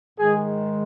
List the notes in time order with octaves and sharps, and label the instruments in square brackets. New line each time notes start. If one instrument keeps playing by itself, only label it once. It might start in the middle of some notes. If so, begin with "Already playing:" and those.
[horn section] G#2 D#3 G#3 G#4